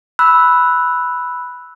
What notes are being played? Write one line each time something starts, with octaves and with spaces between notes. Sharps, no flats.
B5 E6 F#6